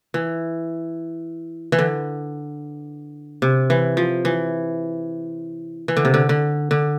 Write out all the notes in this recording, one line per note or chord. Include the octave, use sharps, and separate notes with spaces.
E3
E3
D3
C3
E3
F3
E3
E3
D3
C3
D3
D3
D3